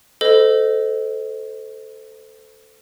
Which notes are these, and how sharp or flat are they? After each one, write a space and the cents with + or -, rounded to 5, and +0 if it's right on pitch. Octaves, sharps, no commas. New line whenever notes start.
A4 +0 C5 -30 D#5 +0